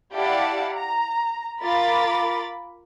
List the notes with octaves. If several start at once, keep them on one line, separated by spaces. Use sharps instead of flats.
E4 G4 D5 F5 F#5 A5
A#5
F4 A#4 B5 D6 A6